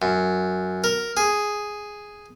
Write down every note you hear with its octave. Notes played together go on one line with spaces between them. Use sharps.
F#2
A#4
G#4